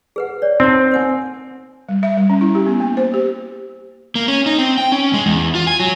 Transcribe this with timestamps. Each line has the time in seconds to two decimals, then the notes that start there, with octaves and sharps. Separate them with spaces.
0.16 G#4 B4 F#5
0.42 C#5 D5
0.60 C4 D#4 A5
0.92 C5 F#5 G#5
1.89 G3
2.03 E5
2.17 G3
2.30 C#4
2.41 E4
2.55 G4
2.66 B3
2.80 A#3
2.97 C5
3.14 G4
4.15 A#3
4.28 C#4
4.46 D#4
4.58 C4
4.78 G5
4.92 C#4
5.14 G#3
5.26 E2
5.55 F4
5.67 G#5
5.80 F#3